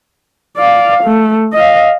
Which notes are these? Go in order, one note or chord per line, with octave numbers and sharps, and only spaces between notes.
D5 F5
A3
D#5 F5